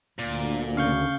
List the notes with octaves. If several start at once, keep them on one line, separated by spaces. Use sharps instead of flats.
D2 A#2
C#3 F5 C#6 G6